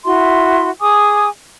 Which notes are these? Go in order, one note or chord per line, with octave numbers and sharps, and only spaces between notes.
E4 F#4 E5 C6
G#4 G#5 D6 D#6